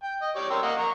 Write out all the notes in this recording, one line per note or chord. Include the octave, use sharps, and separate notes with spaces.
G5
D#5
G4 C#5 D5
A#4 C6 E6
A#3 D#5 F#5
A#5 C#6